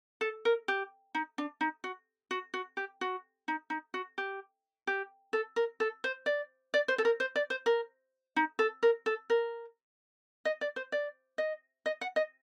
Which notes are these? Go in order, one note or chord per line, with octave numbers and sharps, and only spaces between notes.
A4
A#4
G4
D#4
D4
D#4
F#4
F#4
F#4
G4
F#4
D#4
D#4
F#4
G4
G4
A4
A#4
A4
C5
D5
D5
C5
A4
A#4
C5
D5
C5
A#4
D#4
A4
A#4
A4
A#4
D#5
D5
C5
D5
D#5
D#5
F#5
D#5